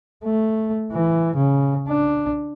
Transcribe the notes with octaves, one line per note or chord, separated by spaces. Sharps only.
A3
E3
C#3
D4